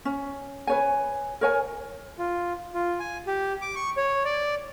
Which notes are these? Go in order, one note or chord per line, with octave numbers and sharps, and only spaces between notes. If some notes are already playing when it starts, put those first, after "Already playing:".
C#4
B4 C#5 G#5
A#4 C#5 G#5
F4
F4
G#5
G4
D6
C#6
C#5
D5